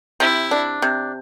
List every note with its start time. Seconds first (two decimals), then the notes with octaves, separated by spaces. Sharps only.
0.20 C3 E4
0.51 D4
0.82 C3